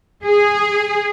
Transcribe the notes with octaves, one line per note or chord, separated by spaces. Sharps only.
G#4